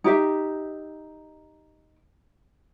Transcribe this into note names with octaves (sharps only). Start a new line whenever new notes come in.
D#4 G4 E5